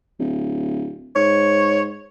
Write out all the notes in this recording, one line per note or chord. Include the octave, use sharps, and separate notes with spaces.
D1
G#2 C#5